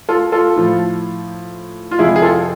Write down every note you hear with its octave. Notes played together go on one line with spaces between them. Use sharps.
F4 A4
F4 A4
A2 F3
F4
F2 C3 F3 E4 G#4
G#4
F4 A4